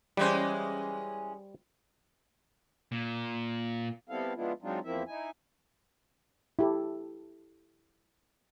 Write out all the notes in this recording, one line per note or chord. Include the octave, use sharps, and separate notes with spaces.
E3 G3 G#3 C#4 C5
A#2
G3 B3 C4 E4 A4 F5
F3 G#3 B3 D4 E4 F4
F#3 G#3 C4 D4 D#4 F4
E2 F3 A#3 C4 E4 E5
D#4 E4 G#5
E4 G4 A4